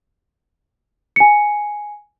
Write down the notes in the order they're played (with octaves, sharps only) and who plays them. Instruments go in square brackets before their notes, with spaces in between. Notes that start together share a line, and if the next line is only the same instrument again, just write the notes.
[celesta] G#5 C#7